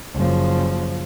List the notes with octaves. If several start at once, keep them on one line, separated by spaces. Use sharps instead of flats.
F#1 F3